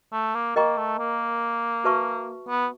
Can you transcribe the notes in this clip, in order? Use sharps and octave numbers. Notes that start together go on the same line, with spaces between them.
A3
A#3
A#3 A#4 D#5 G5 A#5 C#6
A3
A#3
F#4 B4 E5 A5 C#6
B3